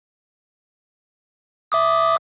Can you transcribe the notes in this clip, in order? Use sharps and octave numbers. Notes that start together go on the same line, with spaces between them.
E5 D6 D#6